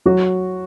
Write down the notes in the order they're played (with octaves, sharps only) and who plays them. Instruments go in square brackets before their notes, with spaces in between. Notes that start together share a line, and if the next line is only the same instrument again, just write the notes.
[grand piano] F#3 [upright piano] F#4